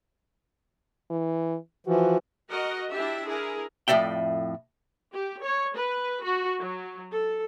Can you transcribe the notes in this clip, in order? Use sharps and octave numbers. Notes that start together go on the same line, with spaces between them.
E3
E3 F3 F#4
F#4 A#4 D#5 F#5
D4 E4 G4 E5
E4 G#4 A#4
F2 A2 D5 E5 G5
G4
C#5
B4
F#4
F#3
A4